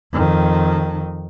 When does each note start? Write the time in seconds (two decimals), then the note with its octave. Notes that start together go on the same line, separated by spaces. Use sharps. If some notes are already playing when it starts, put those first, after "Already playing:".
0.12 F2 D#3